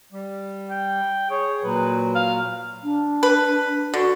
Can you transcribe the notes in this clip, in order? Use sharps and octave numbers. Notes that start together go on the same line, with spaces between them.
G3
G5
G#4 C#5
A#2 F#3 B4
F5
D4
B4
D3 F#4